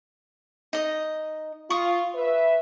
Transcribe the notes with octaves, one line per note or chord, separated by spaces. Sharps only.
D#4 D#5
F4 C#6 D#6
B4 E5